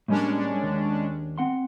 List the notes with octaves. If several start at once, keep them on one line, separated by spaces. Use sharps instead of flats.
A2 G3 G#3 A#3 C#4 D4
D#2
C4 F#5 C6